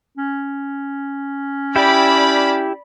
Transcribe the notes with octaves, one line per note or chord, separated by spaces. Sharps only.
C#4
E4 G4 D5 G5 B5